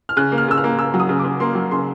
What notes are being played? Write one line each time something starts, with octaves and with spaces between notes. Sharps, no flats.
F6
C#3 F#6
A#3
F6
C#3 E6
F6
A#3
C#3 E6
F#3
D#6
C#3
D6
C#3
A#3 C6
F#3
C#3 C6